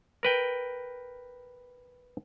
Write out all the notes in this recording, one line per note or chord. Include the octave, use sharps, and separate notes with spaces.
A#4 B4 G5